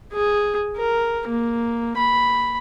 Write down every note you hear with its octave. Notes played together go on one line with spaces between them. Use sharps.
G#4
A#4
A#3
B5